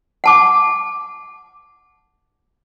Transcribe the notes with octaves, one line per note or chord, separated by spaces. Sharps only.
F#5 A5 D6